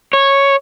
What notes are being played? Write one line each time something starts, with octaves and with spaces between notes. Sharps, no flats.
C#5